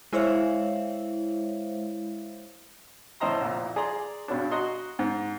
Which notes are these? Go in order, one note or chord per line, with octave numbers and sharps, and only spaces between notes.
G#3 E4 C5 C#5 E5 F5
A1 A2 C5 D#5 A#5 C6
C2 F2 A#2
G#4 D5 A#5 C6
G2 B2 C#4 D4
F#4 D#5 A#5 C6
G#2